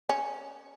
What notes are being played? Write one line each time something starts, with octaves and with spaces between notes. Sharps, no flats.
C#4